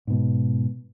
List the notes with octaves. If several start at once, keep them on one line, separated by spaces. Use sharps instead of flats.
G#2 B2